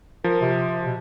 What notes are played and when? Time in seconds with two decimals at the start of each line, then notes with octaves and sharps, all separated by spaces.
0.24 F3 A#4
0.41 C3
0.86 B2